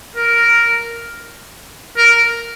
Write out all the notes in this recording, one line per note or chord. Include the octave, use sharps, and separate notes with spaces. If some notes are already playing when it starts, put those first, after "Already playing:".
A#4
A#4